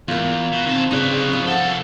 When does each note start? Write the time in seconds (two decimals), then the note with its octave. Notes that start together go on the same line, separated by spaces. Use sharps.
0.08 E2 A#3 F4
0.52 B2
0.66 D#3 C4 A5
0.91 C#3 D4 D#4 G4 B4
1.33 F3
1.47 C2 A4 F#5